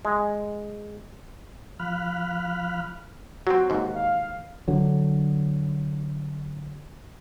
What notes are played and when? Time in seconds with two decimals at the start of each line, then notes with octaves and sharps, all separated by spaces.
0.05 G#3
1.80 F3 F5 B5 F6 F#6
3.47 F#3 C4 F#4
3.70 D#2 G#2
3.95 F5
4.68 D3 F#3